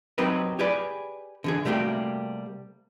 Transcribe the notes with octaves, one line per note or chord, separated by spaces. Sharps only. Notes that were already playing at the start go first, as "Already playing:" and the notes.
F#3 C4 D#4 G4 A#4 B4
G4 G#4 B4 D5
D3 E3 G#4
C3 G3 A3 A#3 F#4 G4